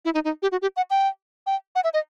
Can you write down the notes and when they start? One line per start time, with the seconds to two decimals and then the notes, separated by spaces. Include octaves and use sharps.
0.05 E4
0.14 D#4
0.25 D#4
0.42 G4
0.52 F#4
0.62 G4
0.77 F#5
0.90 G5
1.47 G5
1.75 F#5
1.84 E5
1.94 D#5